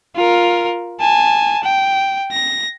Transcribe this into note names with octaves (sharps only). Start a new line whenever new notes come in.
F4 A#4
G#5 A5
G5
A#6